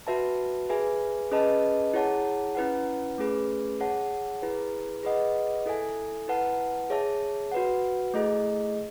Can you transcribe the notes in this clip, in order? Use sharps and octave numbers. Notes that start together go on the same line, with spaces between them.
F#4 B4 E5 A5
G#4 B4 E5 G#5
C#4 G#4 B4 D#5 A5
E4 G#4 C#5 F#5 A5
C#4 E4 B4 F#5
A3 C#4 G#4 B4
G#4 C#5 F#5 A5
E4 G#4 B4
G#4 B4 D#5 F#5
E4 A4 E5 G#5
E4 B4 F#5 A5
G#4 C#5 E5 A5
F#4 B4 F#5
A3 E4 G#4 D#5